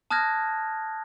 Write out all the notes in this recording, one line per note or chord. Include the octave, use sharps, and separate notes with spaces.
A5 D#6 F6 F#6 G#6 A#6